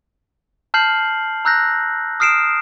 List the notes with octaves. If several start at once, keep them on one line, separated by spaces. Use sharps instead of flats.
A5 F6 G6 C7 F#7
A#5 E6 F#6 G6 A#6
D#6 F6 C7 D7 E7